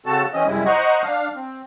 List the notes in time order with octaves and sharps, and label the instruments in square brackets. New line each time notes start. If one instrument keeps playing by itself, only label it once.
[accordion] C#3 C4 F#4 A4 A5
E3 C4 C#4 D#5
F#2 C3 G3 G#3 E4
C5 D#5 F#5 A#5 C#6
D4 F5
C4